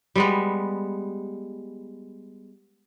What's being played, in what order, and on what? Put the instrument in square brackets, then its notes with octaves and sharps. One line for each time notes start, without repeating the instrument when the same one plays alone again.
[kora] G3 G#3 B3